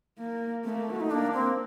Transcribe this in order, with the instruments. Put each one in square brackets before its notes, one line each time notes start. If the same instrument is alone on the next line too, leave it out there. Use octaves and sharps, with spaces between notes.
[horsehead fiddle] A#3
[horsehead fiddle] A3 [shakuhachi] A#3 C4
[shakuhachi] F#4
D#4
[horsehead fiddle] A#3 [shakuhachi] D4
[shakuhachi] C4